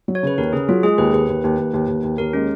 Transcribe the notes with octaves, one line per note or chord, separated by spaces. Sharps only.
F#3
C#5
C#3 B4
D#2 A#4
C#3 G#4
F#3 F4
G#3 G#4
D#2 B4
D#2 B4
D#2
D#2
D#2
D#2
D#2
D#2
D#2 A#4
G#3 C#4